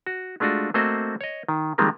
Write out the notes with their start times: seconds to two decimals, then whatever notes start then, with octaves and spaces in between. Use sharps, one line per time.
0.07 F#4
0.40 G#3 A3 D4 F4 F#4
0.74 A3 A#3 C4 F#4 C5 D#5
1.21 C#5 D#5
1.48 D#3
1.78 D#3 F3 G3 G#3 A#3 C4